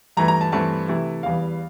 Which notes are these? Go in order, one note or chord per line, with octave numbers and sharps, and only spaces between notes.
G2 E3 A3 A#5
A#5
A5
G2 E3 A3 C4 A5
C3 E3 A3 E4
E2 E3 G3 F5